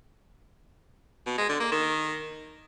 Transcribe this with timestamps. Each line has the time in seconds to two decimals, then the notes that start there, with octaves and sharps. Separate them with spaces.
1.26 B2
1.38 G#3
1.49 D3
1.60 A#3
1.72 D#3